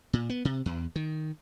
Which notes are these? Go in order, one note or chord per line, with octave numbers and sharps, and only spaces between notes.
A#2
B3
C3
E2
D#3